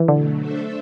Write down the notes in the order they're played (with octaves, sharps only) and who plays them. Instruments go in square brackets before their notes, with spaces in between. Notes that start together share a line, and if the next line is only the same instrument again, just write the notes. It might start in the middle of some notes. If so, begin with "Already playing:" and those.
Already playing: [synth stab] E3
[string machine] B2 F#3 A3 [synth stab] D3
[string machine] A3 D4 A4 C5 E5